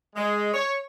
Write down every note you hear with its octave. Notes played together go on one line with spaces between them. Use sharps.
G#3
C#5